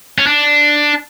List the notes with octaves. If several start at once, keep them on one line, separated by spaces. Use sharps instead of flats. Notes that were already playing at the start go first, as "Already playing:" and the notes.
C#4
D4